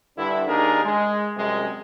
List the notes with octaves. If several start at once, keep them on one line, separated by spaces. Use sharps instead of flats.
G2 D3 D4 E4
D#2 D4 D#4 G#4 A#4
G#3
F#2 C3 G3 G#3